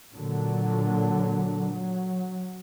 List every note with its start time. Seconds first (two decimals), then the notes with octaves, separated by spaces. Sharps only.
0.13 A#2 D3 F#3
1.74 F#3